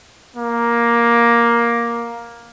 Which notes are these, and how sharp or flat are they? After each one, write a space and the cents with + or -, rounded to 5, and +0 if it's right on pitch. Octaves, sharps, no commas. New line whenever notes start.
A#3 +10